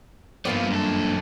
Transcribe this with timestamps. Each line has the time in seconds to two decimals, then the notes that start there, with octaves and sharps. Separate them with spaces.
0.45 G2 F3 A#3 B3 D5
0.70 F#2 A4